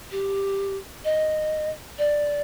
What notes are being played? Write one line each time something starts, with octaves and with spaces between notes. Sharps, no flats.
G4
D#5
D5